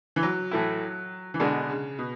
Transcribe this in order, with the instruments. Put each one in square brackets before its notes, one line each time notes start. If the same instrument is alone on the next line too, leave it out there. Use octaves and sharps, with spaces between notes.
[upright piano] E3
F#3
[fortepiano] A2 E3 A3 E4
[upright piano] E3
[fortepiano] B2 G#3 D4 [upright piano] D3
[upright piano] C#3
B2